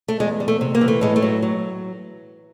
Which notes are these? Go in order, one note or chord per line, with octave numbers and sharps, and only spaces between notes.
A3
E2 G#3
G3
A3
C3
A#3
E3
A3
A2 G#3
A3
F#3
F#3